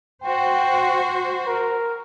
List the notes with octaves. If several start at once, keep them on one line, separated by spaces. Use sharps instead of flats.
F#4 C5 G5
A#4